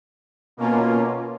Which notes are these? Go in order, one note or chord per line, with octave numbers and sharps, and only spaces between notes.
B2 A#3 C#4 F4